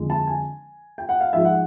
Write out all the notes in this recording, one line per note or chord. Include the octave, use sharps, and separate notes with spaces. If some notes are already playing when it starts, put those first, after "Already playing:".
Already playing: F2 D3 F3 G#3
A5
G#5
G5
F#5
F5
G#2 F3 G#3 E5
F#5